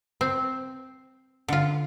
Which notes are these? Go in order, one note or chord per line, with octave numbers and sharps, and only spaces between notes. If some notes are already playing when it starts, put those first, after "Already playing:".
C4
D3 F4